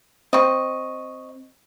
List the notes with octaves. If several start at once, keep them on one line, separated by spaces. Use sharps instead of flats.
C4 D#5 C#6